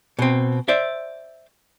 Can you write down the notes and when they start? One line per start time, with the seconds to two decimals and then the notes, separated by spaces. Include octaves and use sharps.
0.19 B2 C4
0.68 C5 D5 E5